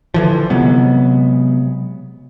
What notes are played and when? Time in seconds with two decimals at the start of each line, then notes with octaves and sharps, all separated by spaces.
0.14 D3 E3 F3
0.50 C3 F#3 G#3 B3